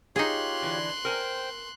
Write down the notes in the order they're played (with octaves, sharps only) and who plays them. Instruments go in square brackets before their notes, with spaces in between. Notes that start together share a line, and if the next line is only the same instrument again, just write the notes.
[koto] D#4 G#4 [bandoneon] F4 G4 C#5 [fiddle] C6 F#6
[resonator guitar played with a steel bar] D3 E3
[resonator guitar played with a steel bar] A#4 G#5 A#5 [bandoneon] C5 G5